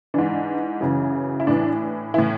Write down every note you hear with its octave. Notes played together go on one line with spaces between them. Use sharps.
G#2 E3 D4
F#2 C#3 E3
E4
A2 E3 D4
A2 E3 E4